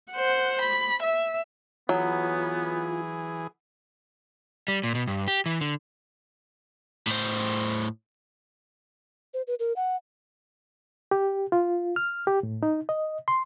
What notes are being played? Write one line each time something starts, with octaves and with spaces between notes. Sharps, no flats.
C5 F#5
B5
E5
E3 F#3 B3 F4 G#4
G3
A#2
B2
G2
G4
E3
D3
A2 C5
C5
B4
A#4
F#5
G4
F4
F6
G4
A2
D#4
D#5
C6